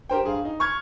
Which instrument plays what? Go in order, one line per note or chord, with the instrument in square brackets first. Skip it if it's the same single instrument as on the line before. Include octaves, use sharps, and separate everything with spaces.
[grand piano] G4 A#4 C5 G5
G2 G#4 F5
D#4
C#6 F6 G#6